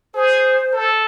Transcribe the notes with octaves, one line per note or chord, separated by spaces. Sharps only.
G#4 C5
A4